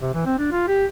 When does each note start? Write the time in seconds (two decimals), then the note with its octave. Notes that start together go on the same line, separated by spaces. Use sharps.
0.01 C3
0.14 E3
0.26 C4
0.39 D4
0.52 F4
0.68 G4